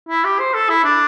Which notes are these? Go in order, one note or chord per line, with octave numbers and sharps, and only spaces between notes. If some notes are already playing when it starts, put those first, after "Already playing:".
E4
G4
C5
A4
E4
D4